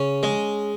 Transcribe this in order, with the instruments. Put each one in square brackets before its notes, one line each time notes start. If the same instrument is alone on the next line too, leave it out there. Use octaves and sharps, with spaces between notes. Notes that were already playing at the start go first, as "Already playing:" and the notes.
Already playing: [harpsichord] C#3 C#4
G#3